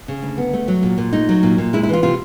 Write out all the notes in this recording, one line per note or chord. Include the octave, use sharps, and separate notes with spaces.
C#3
D2
B3
A3
F#3
A#2
A#2
A3 D#4
F#3
A#2
A#2
G#3 E4
E4
E3 F4
C3 F4